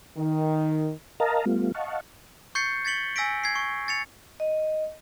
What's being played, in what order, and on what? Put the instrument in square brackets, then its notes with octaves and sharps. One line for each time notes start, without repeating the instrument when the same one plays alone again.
[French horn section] D#3
[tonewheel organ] A#4 D#5 F5 A5 A#5
G3 A3 B3 F4
D#5 F5 F#5 A5 C#6
[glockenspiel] C#6 G6 A6 C7 C#7
G#6 A6 B6 C#7 F#7 G7
G#5 E6 A#6 B6 D7
G#6 C7
C#6
A6 C#7 F7
[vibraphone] D#5